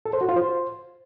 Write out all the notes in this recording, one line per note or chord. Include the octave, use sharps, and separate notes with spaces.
A4
C5
F#4
F4
C5